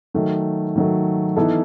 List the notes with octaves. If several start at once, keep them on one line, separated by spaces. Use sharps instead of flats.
D#3 F#3 A3
D#3 F#3 A3
E3 B3 D#4 A4